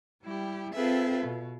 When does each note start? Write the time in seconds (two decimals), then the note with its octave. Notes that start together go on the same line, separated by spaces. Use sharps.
0.23 G3 E4 G4
0.74 C4 F4 G#4 A4 B4 E5
1.26 B2